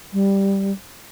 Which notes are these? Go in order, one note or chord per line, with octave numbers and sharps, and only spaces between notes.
G3